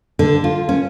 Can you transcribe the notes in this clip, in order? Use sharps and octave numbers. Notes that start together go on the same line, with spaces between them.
D3
F4
C#4